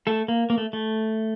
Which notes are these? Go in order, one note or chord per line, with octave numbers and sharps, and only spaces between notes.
A3 A4
A#3
A#3
A3
A3